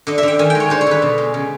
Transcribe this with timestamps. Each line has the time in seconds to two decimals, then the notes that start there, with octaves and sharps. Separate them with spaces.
0.07 D3 D#5
0.18 E5
0.23 D3 G5
0.39 D#3 G#5
0.50 G#3 G5
0.60 C#5
0.70 D3 C5
0.81 C#5
0.87 D3 B4
1.02 B2
1.18 G#3
1.34 C#3